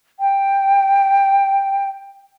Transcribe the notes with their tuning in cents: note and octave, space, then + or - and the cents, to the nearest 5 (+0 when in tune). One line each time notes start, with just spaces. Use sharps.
G5 +5